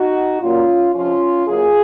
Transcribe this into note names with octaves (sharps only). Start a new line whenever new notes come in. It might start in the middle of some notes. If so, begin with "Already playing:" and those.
Already playing: D#4 F#4
A#2 F#3 A#3 C#4 F4
F2 C3 F3 C#4 F4
F#2 C#3 F#3 A#3 F4 G#4